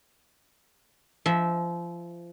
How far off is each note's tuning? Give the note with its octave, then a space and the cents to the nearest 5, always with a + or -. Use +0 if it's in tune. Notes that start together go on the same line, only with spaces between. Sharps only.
F3 -25 E5 -10